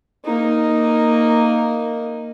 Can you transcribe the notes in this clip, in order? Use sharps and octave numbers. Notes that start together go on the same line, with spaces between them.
A#3 D#4